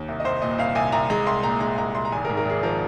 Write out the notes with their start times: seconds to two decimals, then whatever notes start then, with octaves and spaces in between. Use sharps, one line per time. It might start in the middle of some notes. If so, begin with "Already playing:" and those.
Already playing: D#2
0.08 C2
0.20 D#5
0.24 C2 C5
0.42 A#2 D#5
0.58 C2 F5
0.75 C2 G#5
0.92 C2 A#5
1.10 G#3 A#5
1.27 C2 C6
1.43 A#2 A#5
1.60 G#3 A#5
1.78 C2 A#5
1.95 C2 C6
2.05 A#5
2.12 G#1 G#5
2.25 A#4
2.29 G#2
2.37 A#4
2.45 G#1 G#4
2.63 F3 A#4